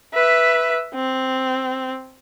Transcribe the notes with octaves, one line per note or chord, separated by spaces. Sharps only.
B4 E5
C4